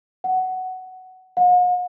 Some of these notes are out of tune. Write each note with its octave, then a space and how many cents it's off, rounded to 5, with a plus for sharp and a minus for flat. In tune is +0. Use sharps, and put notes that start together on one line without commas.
F#5 +10
F#5 -45